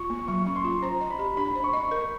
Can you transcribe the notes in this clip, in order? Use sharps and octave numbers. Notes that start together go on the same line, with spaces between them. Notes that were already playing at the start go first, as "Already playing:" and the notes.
Already playing: F4 C#6
A#3
F#3 C#6
C#4
C6
F4
C5 A#5
D#5
B5
G4
D4 B5
C5
C#6
D#5
A#4